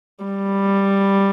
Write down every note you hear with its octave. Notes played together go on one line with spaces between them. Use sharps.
G3